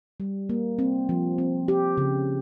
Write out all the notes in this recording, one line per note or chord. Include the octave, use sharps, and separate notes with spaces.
G3
A#3
C4
F3
C4
G4
C#3